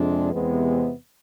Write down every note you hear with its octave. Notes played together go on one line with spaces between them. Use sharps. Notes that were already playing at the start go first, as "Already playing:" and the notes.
Already playing: F2 C3 G#3 D4
E2 C3 G#3 B3